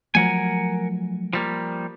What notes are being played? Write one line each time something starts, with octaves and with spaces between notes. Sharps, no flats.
F3 F#3 A3 A#4 F#5 G#5
F3 G3 A#3